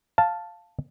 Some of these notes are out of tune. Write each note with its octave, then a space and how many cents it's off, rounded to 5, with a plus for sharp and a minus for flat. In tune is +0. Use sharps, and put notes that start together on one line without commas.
F5 +0 A5 +0